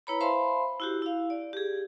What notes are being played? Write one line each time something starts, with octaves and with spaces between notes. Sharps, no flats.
E4 B4 C#5 A#5 B5
C5 E5 F5 A5 B5 C6
E4 F#4 G4
E4 F5
D5
G4 G#4